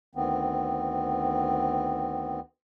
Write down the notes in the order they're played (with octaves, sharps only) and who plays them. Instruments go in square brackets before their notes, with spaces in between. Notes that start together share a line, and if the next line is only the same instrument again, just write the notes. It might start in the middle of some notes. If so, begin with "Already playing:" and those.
[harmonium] D2 D#3 B3 C4